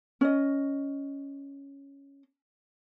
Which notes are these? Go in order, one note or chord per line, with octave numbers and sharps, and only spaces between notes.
C#4 D#5